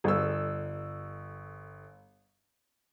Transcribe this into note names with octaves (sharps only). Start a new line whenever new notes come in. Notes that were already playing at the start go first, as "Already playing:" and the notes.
G1 E6